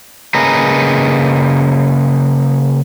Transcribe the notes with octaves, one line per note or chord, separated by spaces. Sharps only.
C#3 A#3 G#4 B4 D#5 A#5